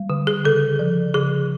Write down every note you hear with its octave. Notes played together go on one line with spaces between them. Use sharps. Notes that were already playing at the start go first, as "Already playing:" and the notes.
Already playing: G3
D3
G#4
C#3 A4
F3
C#3 G#4